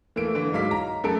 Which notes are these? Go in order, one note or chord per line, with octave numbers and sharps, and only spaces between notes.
E3 A3 A#3 D7
D3 E3
G#2 F#3 F5 D6 B6
A#5
F#2 A3 A4 D7